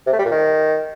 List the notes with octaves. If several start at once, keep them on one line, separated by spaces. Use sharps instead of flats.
C3
A3
G3
A#2
D#3